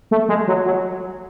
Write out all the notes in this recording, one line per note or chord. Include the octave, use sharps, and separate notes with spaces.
A3
G#3
F#3
F#3